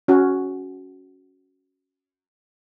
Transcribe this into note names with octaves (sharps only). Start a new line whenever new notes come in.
C#4 F#4